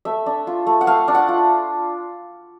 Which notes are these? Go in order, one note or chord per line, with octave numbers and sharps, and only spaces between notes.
A3 E5
D4
F4
A3
F#5
A3 F5
D4
F#5
F4